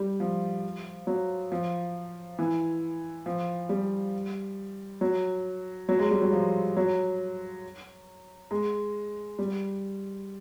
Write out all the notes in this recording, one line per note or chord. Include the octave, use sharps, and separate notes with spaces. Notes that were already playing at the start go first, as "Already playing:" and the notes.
Already playing: G3
F3
F#3
F3
E3
F3
G3
F#3
F#3
G#3
G3
F#3
F3
F#3
G#3
G3